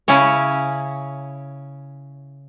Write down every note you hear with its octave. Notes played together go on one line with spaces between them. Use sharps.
C#3 C#4 E4 C#5